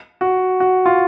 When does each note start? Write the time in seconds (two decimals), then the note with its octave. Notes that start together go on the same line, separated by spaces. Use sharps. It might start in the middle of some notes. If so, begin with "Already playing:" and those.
0.21 F#4
0.60 F#4
0.86 F4